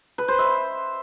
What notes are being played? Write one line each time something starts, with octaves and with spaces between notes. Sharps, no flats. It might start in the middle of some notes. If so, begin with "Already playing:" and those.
B4
C5
E5